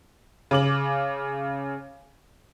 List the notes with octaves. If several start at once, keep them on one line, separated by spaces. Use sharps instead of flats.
C#3 D6 F#7